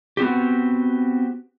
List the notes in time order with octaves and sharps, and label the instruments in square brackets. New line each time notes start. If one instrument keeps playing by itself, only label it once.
[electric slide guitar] B3 C4 F#4 G4